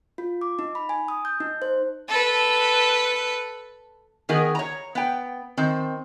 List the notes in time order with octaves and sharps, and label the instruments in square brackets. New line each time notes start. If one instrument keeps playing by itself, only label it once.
[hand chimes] F4
D6
D#4
B5
G#5
D#6
G6
D#4
C5
[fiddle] A4 B4
[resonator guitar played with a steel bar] D#3 B3 G#4 A#4
C#5 A#5
B3 G5
D#3 C4